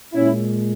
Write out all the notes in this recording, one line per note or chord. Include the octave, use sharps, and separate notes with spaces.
A#2 G#3 C#4 E4